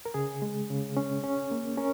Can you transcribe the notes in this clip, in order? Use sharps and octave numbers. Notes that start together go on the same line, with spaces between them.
A#4
C#3 G#4
G#3
C#3
C#4
C#4
A#3
C#4 A#4